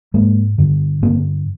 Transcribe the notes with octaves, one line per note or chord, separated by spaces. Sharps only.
G#2 G#3 A#3
G2 D3
G2 D3 A#3 C4